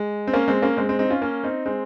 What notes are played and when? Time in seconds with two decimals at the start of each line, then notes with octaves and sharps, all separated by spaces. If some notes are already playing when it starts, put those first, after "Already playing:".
Already playing: G#3
0.27 C4
0.33 A#3 C#4
0.48 G#3 C4
0.62 A#3 C#4
0.77 G#3 C4
0.89 G#3 C4
0.99 C4 D#4
1.10 C#4 F4
1.21 A#3 C#4
1.44 C4 D#4
1.66 G#3 C4